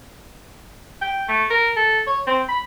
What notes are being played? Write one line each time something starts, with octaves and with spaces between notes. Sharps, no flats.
G5
A3
A#4
A4
C#5
C4
B5